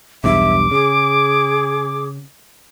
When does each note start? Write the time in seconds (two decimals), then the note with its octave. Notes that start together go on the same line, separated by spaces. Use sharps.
0.24 B1 E2 G2 E5 D6
0.71 C#3 G#4